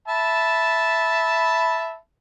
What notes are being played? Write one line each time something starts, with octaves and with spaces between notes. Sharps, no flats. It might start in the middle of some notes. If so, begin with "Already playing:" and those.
E5 A5 B5